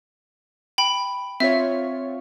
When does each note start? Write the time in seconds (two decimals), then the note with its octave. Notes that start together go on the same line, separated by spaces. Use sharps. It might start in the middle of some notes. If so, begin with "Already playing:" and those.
0.78 G5 B5
1.40 C4 F4 C#5 E5